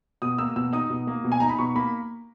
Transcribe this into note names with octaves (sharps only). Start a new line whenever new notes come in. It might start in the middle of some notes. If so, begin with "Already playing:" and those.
B2 D#6
A#3 E6
B2 E6
D#4 D#6
B2
A#3
B2
G#5
D#4 A#5
B5
B2 C#6
A#3 B5